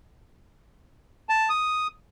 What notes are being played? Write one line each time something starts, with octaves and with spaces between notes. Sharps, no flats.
A5
D#6